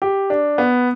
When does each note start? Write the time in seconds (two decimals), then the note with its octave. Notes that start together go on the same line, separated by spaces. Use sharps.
0.02 G4
0.30 D4
0.58 B3